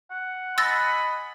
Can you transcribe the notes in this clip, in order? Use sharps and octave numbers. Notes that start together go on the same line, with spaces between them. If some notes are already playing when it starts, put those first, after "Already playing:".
F#5
D#5 G#5 B5 E6 A6 A#6